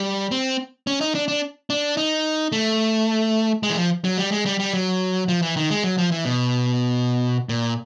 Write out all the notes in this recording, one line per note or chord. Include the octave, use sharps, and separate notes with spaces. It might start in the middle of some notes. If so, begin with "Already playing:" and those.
Already playing: G3
C4
C#4
D#4
D4
D4
D4
D#4
A3
G#3
E3
F3
F#3
G3
G#3
G3
G3
F#3
F3
E3
D#3
G#3
F#3
F3
E3
B2
A#2